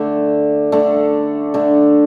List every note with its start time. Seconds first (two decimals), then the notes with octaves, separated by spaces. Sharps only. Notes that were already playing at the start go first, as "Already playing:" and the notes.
Already playing: D3 A3 D4
0.72 D3 A3 D4
1.54 D3 A3 D4